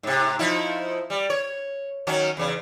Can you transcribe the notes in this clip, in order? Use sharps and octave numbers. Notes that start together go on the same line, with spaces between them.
G#2 C3
F3 D#4 E4
G3
C#5
D#3 F#3 C#4
E2 C#3